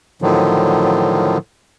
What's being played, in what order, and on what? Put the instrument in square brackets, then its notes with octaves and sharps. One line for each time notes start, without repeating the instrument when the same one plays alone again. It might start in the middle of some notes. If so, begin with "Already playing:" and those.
[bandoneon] A2 D3 D#3 F3 F#3